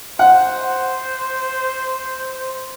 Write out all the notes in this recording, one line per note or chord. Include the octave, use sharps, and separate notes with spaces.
C5 F#5